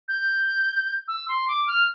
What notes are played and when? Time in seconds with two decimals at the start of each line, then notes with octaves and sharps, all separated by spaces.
0.08 G6
1.08 E6
1.28 C6
1.48 D6
1.68 F6